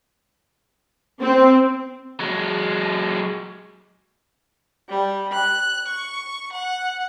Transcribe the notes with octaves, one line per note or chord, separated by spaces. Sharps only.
C4
F#3 G#3
G3
F#6
C#6
F#5